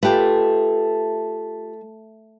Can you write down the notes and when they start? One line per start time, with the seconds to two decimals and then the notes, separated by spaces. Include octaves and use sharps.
0.03 A3 F4 G4 B4